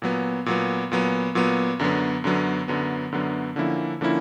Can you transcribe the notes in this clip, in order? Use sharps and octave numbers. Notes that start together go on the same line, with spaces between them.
A#2 F#3 B3
A#2 F#3 B3
A#2 F#3 B3
A#2 F#3 B3
F#2 D3 F#3 B3
F#2 D3 F#3 B3
F#2 D3 F#3 B3
F#2 D3 F#3 B3
D3 F3 A#3 C#4 E4
D3 F3 A#3 C#4 E4